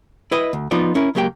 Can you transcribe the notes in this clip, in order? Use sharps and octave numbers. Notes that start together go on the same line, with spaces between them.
E4 B4 D#5
D2
F3 B3 D#4 F4 D5
C#4 E4 A#4
C#2 F#3 A#3 G4 E5 G5